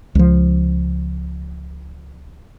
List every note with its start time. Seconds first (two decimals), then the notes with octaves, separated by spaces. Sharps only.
0.15 C#2 F3